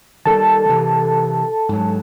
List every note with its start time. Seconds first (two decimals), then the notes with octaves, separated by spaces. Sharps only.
0.26 D#3 G3 A4 A5
0.69 C3 E3
1.69 G#2 F#3